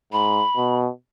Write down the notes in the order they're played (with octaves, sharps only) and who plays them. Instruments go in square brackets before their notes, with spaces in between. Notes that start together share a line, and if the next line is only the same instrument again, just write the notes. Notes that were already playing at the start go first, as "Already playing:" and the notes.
[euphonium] G#2 [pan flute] B5
[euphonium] B2